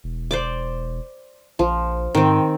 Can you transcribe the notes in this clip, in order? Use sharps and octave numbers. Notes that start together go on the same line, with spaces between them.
E1
C5 D5 D6
A#1 F3
G#2 D#3 C4